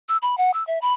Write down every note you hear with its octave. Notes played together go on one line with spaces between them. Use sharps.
E6
B5
F#5
E6
E5
B5